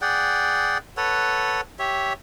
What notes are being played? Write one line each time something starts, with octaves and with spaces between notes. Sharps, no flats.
G#4 D5 F#5 G5
A4 B4 C#5 F#5
G4 C#5 E5